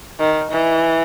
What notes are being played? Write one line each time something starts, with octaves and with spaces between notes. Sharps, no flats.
D#3
E3